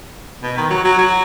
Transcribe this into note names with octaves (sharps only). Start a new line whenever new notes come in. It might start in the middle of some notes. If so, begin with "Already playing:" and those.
B2
D#3
F#3
F#3
F#3